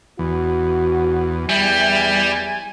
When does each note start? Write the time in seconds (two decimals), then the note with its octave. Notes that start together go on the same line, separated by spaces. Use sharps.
0.19 E2 F#4
1.49 E2 G3 E5 G#5